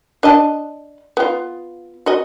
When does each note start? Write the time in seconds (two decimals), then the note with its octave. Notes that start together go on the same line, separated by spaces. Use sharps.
0.23 D4 D#5 A5
1.17 B3 F4
2.06 F#4 D#5